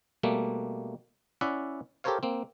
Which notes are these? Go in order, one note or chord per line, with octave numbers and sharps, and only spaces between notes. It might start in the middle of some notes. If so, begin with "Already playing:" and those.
B2 G3 A3 A#3
C#4 E4 D5 E5 F#5
G4 A4 A#4 C5 C#5 F5
A#3 C4